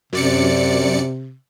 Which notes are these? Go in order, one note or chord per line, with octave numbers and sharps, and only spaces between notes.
F#2 C3 D5 C#7